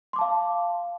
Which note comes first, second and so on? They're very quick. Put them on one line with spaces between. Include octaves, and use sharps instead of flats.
C6 D6 A5 F5